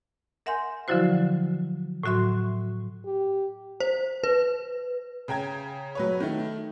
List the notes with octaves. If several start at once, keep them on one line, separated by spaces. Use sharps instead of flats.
A#4 E5 F#5 G#5 C6 G6
D3 F3 F#3 E4 F#4 C5
A2 F#3 F#4 E5 C6
G4
C5
B4
C#3 G5 A#5 G#6
F#3 B4 C#5
D#3 A3